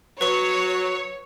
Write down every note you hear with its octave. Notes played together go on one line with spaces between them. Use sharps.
F#3 B4 C#5 C#6